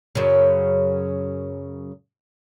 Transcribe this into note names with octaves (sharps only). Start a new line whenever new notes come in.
F#2 C#3